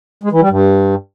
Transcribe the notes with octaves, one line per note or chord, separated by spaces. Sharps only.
G#3
E3
G3
G2